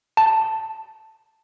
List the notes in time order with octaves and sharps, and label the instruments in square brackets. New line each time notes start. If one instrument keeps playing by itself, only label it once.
[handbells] A5